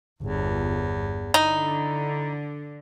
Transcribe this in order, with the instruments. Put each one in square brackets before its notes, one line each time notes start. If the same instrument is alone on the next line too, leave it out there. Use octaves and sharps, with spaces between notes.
[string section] G1 [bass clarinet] E2
[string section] D3 [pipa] D#4 [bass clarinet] E4